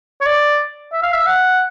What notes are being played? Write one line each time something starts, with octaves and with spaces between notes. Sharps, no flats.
C#5
D5
E5
F5
E5
F#5